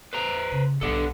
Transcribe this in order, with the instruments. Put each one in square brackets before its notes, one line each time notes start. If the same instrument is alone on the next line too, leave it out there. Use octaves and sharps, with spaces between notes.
[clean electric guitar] B4 C5 A#5
[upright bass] C#3
[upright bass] B1 G2 [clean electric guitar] B3 D4 A4